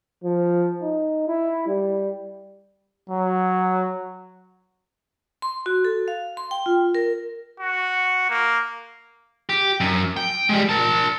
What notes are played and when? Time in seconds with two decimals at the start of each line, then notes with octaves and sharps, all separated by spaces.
0.24 F3
0.82 D#4
1.28 E4
1.67 G3
3.10 F#3
5.42 C6
5.66 F#4
5.85 A4
6.08 F5
6.37 C6
6.51 G5
6.66 F4
6.95 A#4
7.60 F#4
8.29 A#3
9.49 G4
9.80 F#2
10.17 G5
10.49 G3 G#3
10.69 A#4 A5